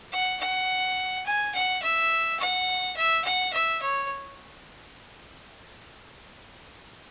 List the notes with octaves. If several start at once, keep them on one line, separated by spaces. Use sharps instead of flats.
F#5
F#5
G#5
F#5
E5
F#5
E5
F#5
E5
C#5